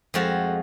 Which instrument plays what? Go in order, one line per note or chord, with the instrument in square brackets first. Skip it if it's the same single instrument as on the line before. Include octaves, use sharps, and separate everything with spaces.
[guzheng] F2 F3 G#3 F#4